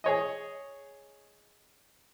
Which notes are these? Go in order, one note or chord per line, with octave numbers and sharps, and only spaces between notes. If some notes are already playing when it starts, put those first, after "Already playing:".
G#4 C#5 D#5